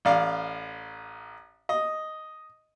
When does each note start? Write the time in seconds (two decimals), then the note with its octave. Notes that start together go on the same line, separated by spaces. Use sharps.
0.05 A1 D5 F5
1.69 D#5